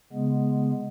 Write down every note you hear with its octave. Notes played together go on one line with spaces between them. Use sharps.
C#3 G#3 B3